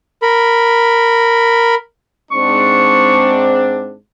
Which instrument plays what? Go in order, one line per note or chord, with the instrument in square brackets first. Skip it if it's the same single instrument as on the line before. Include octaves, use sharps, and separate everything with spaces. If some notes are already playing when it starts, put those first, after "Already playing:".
[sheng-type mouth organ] A#4 B5
[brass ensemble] G#2 C4 D4 [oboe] C#6